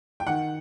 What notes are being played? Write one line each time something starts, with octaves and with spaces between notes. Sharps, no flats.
G5
D#3 F#5